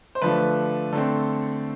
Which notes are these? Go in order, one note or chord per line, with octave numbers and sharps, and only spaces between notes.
C5
D3 F3 A3 B4
D3 A3 C4 A4